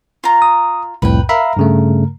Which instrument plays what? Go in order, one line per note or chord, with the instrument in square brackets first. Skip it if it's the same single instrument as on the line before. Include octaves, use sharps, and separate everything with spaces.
[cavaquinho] F4 A#5
[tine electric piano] D#6
[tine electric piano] C2 F2 A2 [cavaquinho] B4 G5
[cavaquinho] A#4 [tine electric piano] E5 F5 B5
[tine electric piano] G2 C#3 A3